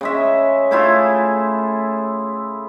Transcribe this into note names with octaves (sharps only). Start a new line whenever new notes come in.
C#3 G#3 E5
A3 E4 F4 G#4